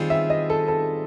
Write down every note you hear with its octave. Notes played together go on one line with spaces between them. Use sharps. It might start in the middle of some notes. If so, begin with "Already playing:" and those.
Already playing: D#3 G3 C4 F4 G#4
E5
D#5
A4
A4